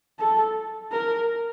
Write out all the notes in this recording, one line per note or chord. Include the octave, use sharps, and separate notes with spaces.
A4
A#4